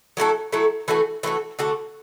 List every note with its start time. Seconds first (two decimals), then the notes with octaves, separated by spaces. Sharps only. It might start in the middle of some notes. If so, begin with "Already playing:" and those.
0.17 F#3 A3 E4 A4
0.52 F#3 A3 E4 A4
0.88 E3 A3 F#4 A4
1.23 E3 A3 F#4 A4
1.59 D3 A3 F#4 A4